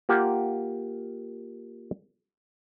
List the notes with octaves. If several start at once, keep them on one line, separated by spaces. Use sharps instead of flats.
A#3 F4 G4 F#5